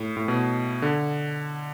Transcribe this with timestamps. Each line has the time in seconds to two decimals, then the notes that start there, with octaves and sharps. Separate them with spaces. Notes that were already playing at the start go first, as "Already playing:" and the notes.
Already playing: A2
0.17 A2
0.28 B2
0.82 D3